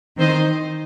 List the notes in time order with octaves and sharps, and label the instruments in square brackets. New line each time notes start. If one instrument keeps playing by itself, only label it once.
[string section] D#3 C4 D#4 C5 D#5